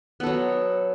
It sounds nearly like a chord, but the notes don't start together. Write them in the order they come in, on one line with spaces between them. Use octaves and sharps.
B3 A4 F#3